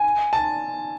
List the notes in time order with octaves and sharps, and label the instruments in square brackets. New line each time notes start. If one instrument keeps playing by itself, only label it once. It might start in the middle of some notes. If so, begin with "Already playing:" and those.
Already playing: [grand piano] G#5
A5